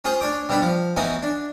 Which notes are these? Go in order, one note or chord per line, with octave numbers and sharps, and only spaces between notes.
C#4 F4 G#4 C5
D4 C#5 D6
B2 G3 D4 B5
F3
E3 B3 C#4 D#4 F#4
D4